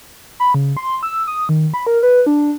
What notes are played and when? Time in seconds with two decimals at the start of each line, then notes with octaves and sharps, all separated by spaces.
0.40 B5
0.54 C#3
0.77 C6
1.03 E6
1.27 D#6
1.49 D#3
1.74 B5
1.87 A#4
2.03 B4
2.26 D4